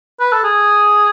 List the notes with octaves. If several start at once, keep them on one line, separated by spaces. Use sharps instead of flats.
B4
A4
G#4